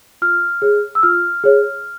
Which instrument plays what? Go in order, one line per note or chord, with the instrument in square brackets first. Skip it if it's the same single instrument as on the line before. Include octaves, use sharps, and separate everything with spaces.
[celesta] F4 F6
G#4 C#5
E6
F4 F6
G#4 C#5